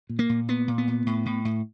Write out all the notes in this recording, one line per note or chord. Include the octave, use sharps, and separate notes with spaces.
A#2
A#3
A#2
A#2 B3
A#2
B3
A#2
A2
A2
A2